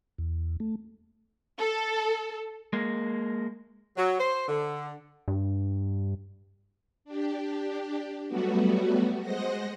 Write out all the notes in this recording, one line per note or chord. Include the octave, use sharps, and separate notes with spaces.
E2
A3
A4
G#3 A#3
F#3
C5
D3
G2
D4 G4
F#3 G3 A3 B3 F#4
G#3 C5 D#5 F#5 A#6